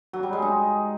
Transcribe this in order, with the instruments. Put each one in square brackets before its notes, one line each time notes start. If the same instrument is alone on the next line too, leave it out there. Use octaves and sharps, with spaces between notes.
[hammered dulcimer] F#3
G3
G#3
D#4